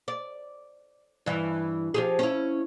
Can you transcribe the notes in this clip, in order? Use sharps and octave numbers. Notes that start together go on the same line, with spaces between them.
D5
G2 E3
F3 G4 G#4
C#4 E4